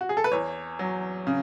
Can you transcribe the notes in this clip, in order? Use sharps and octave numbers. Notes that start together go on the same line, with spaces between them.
F#4
G#4
A4
B4
E2 C#5
F#3
C#3